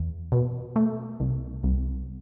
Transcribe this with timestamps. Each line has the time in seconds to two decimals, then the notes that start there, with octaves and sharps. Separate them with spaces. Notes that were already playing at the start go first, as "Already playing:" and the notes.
Already playing: E2
0.32 B2
0.76 A3
1.20 C2
1.63 C2